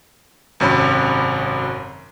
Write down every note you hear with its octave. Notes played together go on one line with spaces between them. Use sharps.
G#1 F#2 C3 C#5 B5